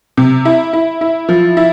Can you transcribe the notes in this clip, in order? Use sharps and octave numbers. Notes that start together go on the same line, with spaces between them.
C3
E4
E4
E4
F3
E4